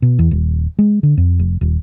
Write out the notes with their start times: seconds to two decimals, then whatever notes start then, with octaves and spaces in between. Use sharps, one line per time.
0.02 B2
0.19 E2
0.31 D#1
0.79 G#3
1.03 D3
1.17 F2
1.39 F1
1.61 D#1